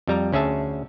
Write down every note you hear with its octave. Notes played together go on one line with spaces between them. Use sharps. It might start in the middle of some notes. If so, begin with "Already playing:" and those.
F2 G3 A#5
D2 C#4 G#4 E5 A5